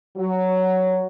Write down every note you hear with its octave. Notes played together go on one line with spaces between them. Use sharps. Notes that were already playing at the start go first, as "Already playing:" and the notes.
F#3